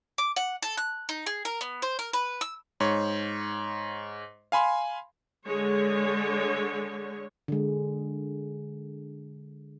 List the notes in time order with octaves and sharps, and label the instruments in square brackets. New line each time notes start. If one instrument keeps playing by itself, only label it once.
[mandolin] D6
F#5
A4
F#6
D#4
G#4
A#4
B3
C5
A#4
B4
E6
[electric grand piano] G#2 C#5
F5 G#5 B5 C6
[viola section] D3 G#3 C#5
[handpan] D3 G#3